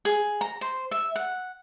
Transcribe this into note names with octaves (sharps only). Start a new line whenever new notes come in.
G#4
A#5
C5
E5
F#5